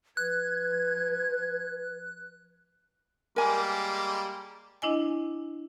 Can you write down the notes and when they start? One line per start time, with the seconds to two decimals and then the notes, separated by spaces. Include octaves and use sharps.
0.17 F3 B4 F#6 G#6
3.36 G3 G#3 A#3 A#4 G#5
4.82 D4 E4 D#5 G#5